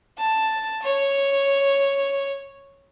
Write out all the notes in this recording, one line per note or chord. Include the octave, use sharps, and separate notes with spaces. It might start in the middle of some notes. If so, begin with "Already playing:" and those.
A5
C#5